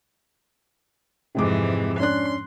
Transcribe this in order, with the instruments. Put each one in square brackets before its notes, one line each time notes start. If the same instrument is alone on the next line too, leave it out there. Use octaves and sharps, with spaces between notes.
[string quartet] F2 G#2 E3 [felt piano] C3 G#3 D6
[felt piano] C#4 D4 F#6 [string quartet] C6